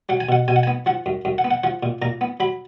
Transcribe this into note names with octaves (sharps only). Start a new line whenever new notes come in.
F#3 F#5
G#5
B2 F#5
B2 G#5
F#5
B3 G#5
F3 F#5
F#2
F#2
F#5
B3
F#5
F3 F#5
A#2
A#2 A#5
B3
F#3 B5